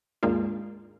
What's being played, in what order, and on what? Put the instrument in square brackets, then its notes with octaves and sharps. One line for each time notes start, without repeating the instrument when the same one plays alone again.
[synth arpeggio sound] D#2 G#2 G#3 A#3 D4 F4